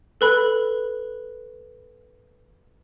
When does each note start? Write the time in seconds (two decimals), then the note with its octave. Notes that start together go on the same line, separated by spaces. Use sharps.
0.21 A4 B4 B5